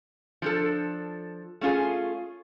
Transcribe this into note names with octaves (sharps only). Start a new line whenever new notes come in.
F3 D4 A4
A3 C#4 F4 G#4